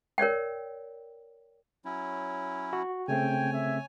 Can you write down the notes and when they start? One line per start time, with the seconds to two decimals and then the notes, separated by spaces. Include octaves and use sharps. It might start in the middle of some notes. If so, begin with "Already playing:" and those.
0.18 A#4 C#5 D5 G5
1.85 F#3 C#4 E4
2.73 F#4
3.08 C#3 A3 C4 C#5 G5 G#5
3.53 E5